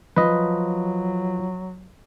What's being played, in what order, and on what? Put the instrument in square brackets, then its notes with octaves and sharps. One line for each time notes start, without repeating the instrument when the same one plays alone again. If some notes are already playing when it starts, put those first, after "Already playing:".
[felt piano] F3 [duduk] F#3 [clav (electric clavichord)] B4 D#5